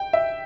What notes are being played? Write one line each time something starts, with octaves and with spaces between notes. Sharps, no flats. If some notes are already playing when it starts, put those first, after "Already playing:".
Already playing: G5
E5